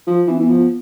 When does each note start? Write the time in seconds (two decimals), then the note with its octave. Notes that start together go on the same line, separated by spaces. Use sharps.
0.07 F3
0.27 E3 C4
0.38 E3 B3
0.49 F3